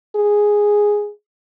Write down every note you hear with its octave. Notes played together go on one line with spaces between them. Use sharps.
G#4